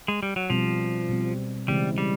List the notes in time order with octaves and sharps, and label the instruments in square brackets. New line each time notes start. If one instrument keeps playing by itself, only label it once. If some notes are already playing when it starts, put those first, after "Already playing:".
[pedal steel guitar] G#3
G3
F#3
[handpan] B2 G3 C4 [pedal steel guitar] F3
[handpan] B2 G3 C4
[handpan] C#3 E3 G#3 C4 E4 [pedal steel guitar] G3
[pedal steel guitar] G3